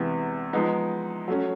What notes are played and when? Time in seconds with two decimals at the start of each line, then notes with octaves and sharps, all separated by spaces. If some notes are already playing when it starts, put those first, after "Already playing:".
Already playing: E2 C3 E3 G#3 B3
0.53 F3 G#3 B3 D#4
1.28 F#3 A3 C#4